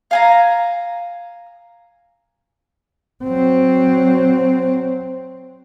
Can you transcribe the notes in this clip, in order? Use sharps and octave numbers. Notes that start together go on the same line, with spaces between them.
F5 G#5 A#5
F#3 C4